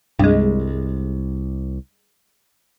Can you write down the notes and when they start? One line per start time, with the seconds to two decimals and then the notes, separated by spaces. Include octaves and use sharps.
0.19 C2 G2 G#3